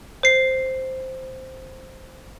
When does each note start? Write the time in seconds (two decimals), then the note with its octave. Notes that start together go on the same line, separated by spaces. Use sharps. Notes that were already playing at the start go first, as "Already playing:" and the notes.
0.23 C5 C7